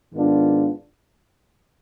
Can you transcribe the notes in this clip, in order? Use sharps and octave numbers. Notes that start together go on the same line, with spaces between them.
G#2 D#3 B3 D4 F4